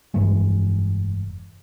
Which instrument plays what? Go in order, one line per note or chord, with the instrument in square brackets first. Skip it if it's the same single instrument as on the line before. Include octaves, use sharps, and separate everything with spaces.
[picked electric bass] F1 G2 E3 G#3